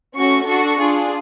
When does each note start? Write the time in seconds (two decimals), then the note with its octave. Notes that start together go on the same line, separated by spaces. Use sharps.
0.16 A3 C#4 F#4 C#6
0.47 D4 F#4 A4 C#6
0.78 D4 F4 G#4